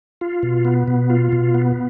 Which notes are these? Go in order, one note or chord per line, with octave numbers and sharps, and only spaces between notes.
F4
B2
B3
B2
F4
B2
B3